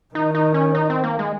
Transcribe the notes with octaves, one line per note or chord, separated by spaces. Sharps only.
D#3 D#4
D#4
C#4
D#4
C4
A#3
G#3